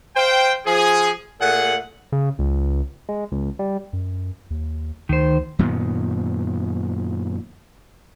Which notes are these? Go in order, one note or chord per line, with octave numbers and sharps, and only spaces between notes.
C5 F5 G5
F3 G#4
A#2 A3 G#4 F#5
C#3
C#2
G#3
C#2
G3
F#2
D#2
D2 D#3 C5
F#2 A#2 D#3 B3